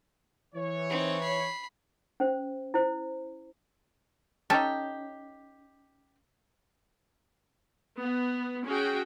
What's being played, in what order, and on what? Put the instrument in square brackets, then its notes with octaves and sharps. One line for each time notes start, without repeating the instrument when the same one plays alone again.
[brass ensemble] E3 C#5
[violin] C4 D#4
B5 C7
[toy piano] C#4 C5
E4 C5
[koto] C#4 A4 [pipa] D#4 G4
[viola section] B3
C#4 F#4 G#4 G5